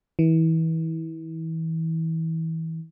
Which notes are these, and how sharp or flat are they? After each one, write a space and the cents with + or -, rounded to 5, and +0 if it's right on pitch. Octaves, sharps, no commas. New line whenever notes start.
E3 -30